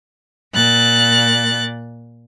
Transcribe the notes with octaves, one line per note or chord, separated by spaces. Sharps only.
A#2 F#6 A6